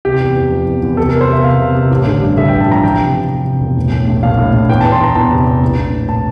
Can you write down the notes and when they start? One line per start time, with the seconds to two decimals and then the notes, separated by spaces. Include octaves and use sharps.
0.05 C3 G4
0.20 E2
0.36 E2
0.52 F3
0.67 E2
0.82 E2
0.97 C3 A4
1.09 C3 A#4
1.21 C5
1.29 C3 E5
1.44 C3 F5
1.60 C3
1.75 C3
1.91 A1
2.07 D3
2.21 G2
2.37 D3 E5
2.49 A1 G5
2.61 A5
2.68 F3 A#5
2.83 E3 G5
2.98 C3
3.15 C3
3.30 C3
3.45 C3
3.60 E1
3.76 A2
3.92 A2
4.08 A#1
4.23 A#1 F5
4.38 A2
4.53 A#1
4.69 E2 G5
4.81 E2 A5
4.92 C6
5.00 E2 A#5
5.15 E2 A5
5.31 C3
5.47 C3
5.62 A#1
5.77 A#1
5.92 A2
6.09 A5